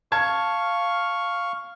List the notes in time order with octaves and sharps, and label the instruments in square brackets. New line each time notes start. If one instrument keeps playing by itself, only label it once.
[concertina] F5 C#6 [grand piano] A5 G#6